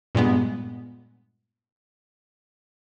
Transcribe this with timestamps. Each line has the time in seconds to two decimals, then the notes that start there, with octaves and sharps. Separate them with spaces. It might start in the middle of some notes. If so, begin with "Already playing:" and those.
0.15 G2 A#2 G#3 B3